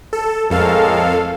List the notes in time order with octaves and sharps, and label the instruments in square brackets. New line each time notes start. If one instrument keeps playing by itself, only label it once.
[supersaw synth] A4
[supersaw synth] F2 A4 F5 [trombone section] A2 G#3 A#4